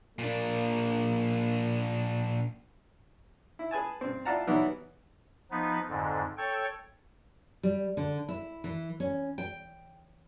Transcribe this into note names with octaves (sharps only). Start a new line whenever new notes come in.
A#2 A#3 D4
E4
G#4 B4 G#5 A5
G2 C4
E4 F4 D5 F#5 A5 A#5
D#3 E3 F#3 G3 B3 E4
F3 B3 D#4 B4
F2 G#2 D3
A4 C#5 G5 G#6
G3
D3
E4
E3
C#4
G5